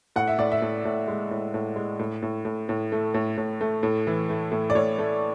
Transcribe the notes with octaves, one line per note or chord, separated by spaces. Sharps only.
A2 F#5
E5
A2 D5
E5
A2
A2
G#3
A2
A2
G#3
A2
A2
A2
A2
A3
A2
A2
A3
A2
E3
A3
A2
D5
A2 C#5
A3